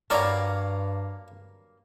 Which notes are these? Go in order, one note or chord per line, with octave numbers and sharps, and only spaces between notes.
G2 F#3 G3 A#3 A#4 C#5 D5